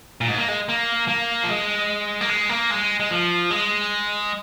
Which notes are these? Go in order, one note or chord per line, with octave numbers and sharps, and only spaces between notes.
A#2
G#2
A#3
G#3
A#3
A#3
F3
G#3
A#3
G#3
A#3
G#3
G#3
F3
G#3